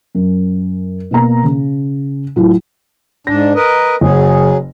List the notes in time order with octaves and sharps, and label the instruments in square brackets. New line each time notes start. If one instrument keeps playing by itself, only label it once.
[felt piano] F#2
B2 A#3 A#5
C#3
A2 F#3 E4 F4
[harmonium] G#2 D4 [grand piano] A#6
[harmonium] A#4 B4 D#5
[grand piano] F#1 [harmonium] F#3 G#4